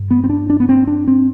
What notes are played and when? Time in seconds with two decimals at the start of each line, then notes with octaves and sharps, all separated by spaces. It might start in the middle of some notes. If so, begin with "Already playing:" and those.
Already playing: G2
0.11 B3
0.24 C4
0.30 D4
0.50 D4
0.60 B3
0.69 C4
0.87 D4
1.07 C4